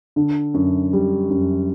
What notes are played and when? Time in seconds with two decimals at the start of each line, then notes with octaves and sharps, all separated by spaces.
0.16 D3
0.54 F#2
0.93 G3
1.30 F#2